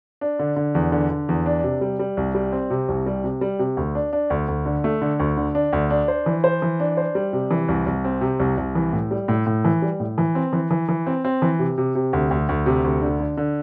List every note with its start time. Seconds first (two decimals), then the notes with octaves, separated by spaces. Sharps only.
0.21 D4
0.39 D3
0.56 D3
0.75 E2
0.92 D3
1.10 D3
1.29 E2
1.46 D4
1.64 C3
1.81 G3
1.99 G3
2.17 C2
2.35 G3
2.52 C4
2.70 C3
2.88 C2
3.06 G3
3.24 C3
3.41 G3
3.59 C3
3.77 D2
3.95 D4
4.13 D4
4.30 D2
4.48 D2
4.66 D3
4.84 A3
5.02 D3
5.20 D2
5.37 D3
5.55 D4
5.73 D2
5.90 D4
6.08 C5
6.26 E3
6.44 C5
6.62 E3
6.80 D4
6.97 C5
7.15 G3
7.33 C3
7.51 E3
7.68 C2
7.86 C2
8.04 C4
8.21 C3
8.40 C2
8.57 C2
8.75 E3
8.93 A2
9.11 G3
9.28 A2
9.47 A2
9.65 E3
9.82 G3
10.00 A2
10.18 E3
10.35 C4
10.53 E3
10.71 E3
10.89 E3
11.07 C4
11.25 C4
11.42 E3
11.59 C3
11.78 C3
11.95 C3
12.13 D2
12.31 D2
12.49 D2
12.66 C3
12.84 D2
13.02 D3
13.20 D3
13.37 D3